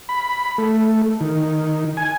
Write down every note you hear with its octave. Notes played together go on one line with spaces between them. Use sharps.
B5
A3
D#3
G#5